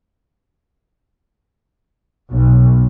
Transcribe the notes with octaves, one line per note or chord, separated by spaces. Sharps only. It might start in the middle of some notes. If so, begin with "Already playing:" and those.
B1